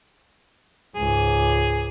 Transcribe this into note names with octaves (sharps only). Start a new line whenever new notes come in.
C#2 G#2 G#4